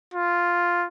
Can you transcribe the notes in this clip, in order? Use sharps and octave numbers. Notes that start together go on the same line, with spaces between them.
F4